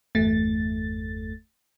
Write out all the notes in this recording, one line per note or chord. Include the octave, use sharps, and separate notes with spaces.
G1 E2 A3 A6